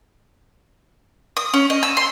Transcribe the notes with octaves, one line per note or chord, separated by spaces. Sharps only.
D#6
C#4
D#5
E6
C6